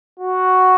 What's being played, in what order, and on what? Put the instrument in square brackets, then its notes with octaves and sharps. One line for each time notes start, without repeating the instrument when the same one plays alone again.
[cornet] F#4